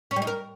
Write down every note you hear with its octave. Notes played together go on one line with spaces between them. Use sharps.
C#4
G3
D#4
A#4